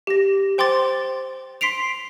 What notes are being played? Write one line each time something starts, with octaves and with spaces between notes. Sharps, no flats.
G4 A#6
C5 G5 C6 D6 A6
C6 B6 C7 D7 F7